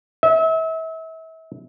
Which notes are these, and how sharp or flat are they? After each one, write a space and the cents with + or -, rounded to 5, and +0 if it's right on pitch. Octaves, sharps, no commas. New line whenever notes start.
E5 -35